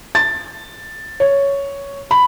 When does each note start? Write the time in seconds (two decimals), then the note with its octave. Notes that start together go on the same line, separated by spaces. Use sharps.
0.15 A6
1.20 C#5
2.11 B5